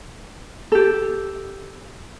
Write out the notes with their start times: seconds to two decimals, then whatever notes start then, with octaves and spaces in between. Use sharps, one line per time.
0.72 G4 A4